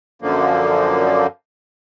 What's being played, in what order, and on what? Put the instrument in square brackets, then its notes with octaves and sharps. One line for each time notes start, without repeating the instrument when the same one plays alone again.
[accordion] F#2 D3 F3 A#3